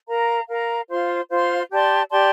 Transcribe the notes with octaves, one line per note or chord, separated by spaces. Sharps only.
A#4 F5 A#5
A#4 F5 A#5
F4 C5 F5 C6
F4 C5 F5 C6
G4 D5 A5 C6
G4 D5 A5 C6